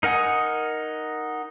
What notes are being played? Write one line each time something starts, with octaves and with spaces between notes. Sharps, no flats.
D#4 A#4 F#5 G#5 D#6